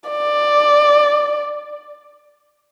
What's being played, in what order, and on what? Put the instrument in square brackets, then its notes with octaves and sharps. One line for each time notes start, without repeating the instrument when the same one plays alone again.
[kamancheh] D5